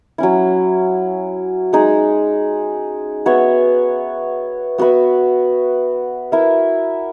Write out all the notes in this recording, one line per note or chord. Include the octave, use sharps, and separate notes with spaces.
F#3 C#4 E4
G#3 D#4 G#4
B3 F#4 C#5 E5
B3 F#4 B4 E5
E4 A#4 E5